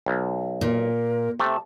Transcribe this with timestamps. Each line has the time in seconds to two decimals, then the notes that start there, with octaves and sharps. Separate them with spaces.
0.06 B1
0.61 A#2 A#4
1.40 C3 A3 A5